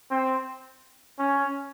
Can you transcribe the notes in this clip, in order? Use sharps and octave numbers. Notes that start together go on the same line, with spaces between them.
C4
C#4